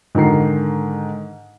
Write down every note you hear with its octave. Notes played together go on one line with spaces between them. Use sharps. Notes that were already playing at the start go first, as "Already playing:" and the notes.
G#2 D3 D#3 A#5 C7